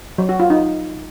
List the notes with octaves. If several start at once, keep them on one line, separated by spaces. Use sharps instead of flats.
F#3
F#4
F4
D#4